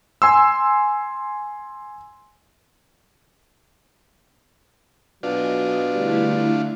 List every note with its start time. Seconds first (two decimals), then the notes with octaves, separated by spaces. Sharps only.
0.22 G#5 C6 E6
5.23 B2 F#3 D4 F4 D#5 G#5
5.94 D3 G3 A3 E4